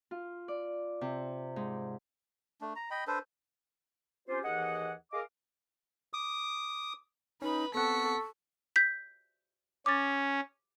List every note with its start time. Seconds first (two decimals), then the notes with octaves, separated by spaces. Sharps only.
0.11 F4
0.48 D5
1.01 C3
1.56 G#2
2.61 A3 D4
2.76 A#5
2.91 D#5 G5 B5
3.07 D4 A4 B4 C5
4.28 C4 C#4 F4 G4 C5
4.44 D#2 E3 G#4 D#5 F#5
5.12 G#4 A#4 D#5 F5 D6
6.13 D6 D#6
7.42 C#4 D#4 B4 B5
7.75 B3 C4 A4 F#5 C#6 B6 C#7
8.76 G6 B6
9.86 C#4 D6 A6